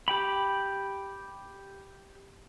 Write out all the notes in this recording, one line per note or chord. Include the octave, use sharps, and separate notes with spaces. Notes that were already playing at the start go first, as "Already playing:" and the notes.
G4 G5 B5